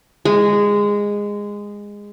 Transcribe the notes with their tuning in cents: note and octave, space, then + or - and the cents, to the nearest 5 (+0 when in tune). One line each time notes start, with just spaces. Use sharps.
G#3 -15